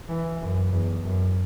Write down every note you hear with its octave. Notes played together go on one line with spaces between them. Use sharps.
E3
F#2
E2
F#2